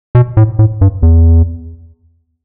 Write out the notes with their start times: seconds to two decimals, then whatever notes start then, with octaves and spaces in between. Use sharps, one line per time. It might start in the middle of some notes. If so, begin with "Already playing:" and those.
0.15 B2
0.37 A2
0.59 A2
0.81 G2
1.03 E2